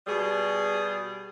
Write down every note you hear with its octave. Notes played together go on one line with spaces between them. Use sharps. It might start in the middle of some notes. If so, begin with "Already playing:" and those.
B2 G3 G#4